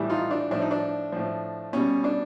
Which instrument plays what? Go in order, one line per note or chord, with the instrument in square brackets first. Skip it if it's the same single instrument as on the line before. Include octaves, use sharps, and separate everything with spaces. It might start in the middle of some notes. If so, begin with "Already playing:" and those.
Already playing: [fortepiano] A2 E3 G3
D#4 F4
D4
A2 F3 D4
D#4
D4
A2 F3
B2 G3 C#4
D4